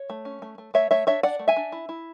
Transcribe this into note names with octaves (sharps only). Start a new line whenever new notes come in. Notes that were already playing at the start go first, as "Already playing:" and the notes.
Already playing: C#5
A3
C#4
A3
A3
A3 C#5 E5
A3 C#5 E5
D4 C#5 E5
D4 D5 F#5
A3
E5 G#5
D4
E4
E4